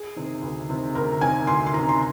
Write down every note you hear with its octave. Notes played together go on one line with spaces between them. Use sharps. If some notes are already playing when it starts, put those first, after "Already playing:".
Already playing: G#4
C3 D#3
D2
C3 D#3
D2 A#4
C3 D#3 G#5
D2 C6
C6
C3 D#3 A#5
C6